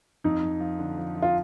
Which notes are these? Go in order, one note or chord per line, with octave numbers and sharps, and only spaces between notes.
F2 D#4
F2
F3
D3
F3
F3
F4